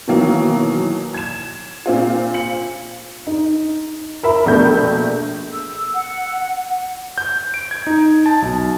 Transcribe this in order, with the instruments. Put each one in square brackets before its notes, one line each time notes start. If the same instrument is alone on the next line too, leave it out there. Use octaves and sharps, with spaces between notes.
[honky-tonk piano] B2 D#3 E3 F#3 A#3
G#6 E7
A#2 C4 F4
C#7 F#7
D#4
A#4 E5 B5
A#1 B2 A3 A#3 G6
[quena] E6
F#5
[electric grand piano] G6
D7
G#6
D#4
A5
B1